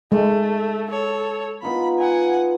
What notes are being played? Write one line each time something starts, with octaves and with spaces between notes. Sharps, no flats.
G#3 A3
A4 C#5
B3 D#4 F4 B5
F#5 G#5